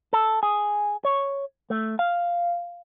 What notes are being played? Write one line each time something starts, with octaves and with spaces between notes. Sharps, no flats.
A4
G#4
C#5
A3
F5